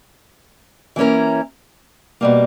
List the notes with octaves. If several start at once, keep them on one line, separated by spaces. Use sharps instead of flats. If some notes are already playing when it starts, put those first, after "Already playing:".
E3 A#3 C#4 E4 A#4
B2 G3 A#3